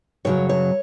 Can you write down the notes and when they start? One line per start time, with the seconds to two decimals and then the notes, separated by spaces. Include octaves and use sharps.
0.25 F#2 C#3 F#3 C#5
0.49 C#5